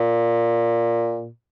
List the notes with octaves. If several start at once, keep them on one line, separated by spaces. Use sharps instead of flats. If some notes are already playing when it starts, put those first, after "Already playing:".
Already playing: A#2